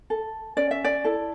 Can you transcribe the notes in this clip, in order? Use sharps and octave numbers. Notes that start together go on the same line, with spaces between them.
A4
C#4 D5
E5
D5
E4 A4